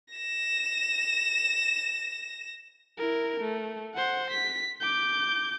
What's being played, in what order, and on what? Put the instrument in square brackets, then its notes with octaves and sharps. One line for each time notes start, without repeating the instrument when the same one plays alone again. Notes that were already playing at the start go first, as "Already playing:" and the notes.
[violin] A#6 E7
[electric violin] E4 A#4
A3
C5 F#5
B6
D6 G6